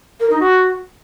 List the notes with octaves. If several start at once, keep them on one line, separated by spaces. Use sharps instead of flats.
A#4
D#4
F#4